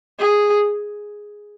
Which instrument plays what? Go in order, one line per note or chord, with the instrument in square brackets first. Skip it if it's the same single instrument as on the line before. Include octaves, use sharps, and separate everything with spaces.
[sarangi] G#4